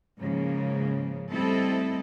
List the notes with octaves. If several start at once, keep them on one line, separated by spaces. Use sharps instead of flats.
G#2 C#3 F3 A#3
G3 A3 C4 E4 A4 D#5